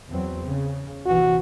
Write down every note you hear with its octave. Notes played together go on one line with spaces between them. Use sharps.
E2 F#3 C4
C#3
A#1 C3 E3 F#4